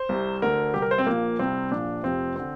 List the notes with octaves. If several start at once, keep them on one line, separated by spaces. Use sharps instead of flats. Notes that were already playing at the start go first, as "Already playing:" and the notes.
Already playing: C5
C2 C3
D2 D3 A#4
C2 C3 G4
A#4
C5
C4
A#1 A#2 A#3
C2 C3 C4
A#1 A#2 D4
F1 F2 C3 C4
D3 C4